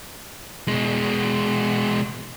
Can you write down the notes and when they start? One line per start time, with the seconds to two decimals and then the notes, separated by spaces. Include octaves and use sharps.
0.68 B2 G#3